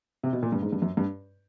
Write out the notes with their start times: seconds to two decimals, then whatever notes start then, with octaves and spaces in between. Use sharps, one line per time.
0.23 C3
0.33 B2
0.43 A#2
0.52 G2
0.63 G#2
0.72 G2
0.82 F#2
0.97 G2